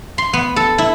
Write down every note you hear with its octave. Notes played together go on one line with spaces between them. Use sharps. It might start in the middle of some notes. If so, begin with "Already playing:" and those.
C6
B3
A4
E4